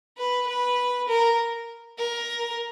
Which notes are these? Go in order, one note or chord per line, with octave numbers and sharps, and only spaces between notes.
B4
B4
A#4
A#4